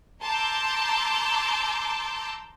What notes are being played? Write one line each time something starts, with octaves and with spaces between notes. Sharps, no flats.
A5 A#5 C6 D6 E6 G6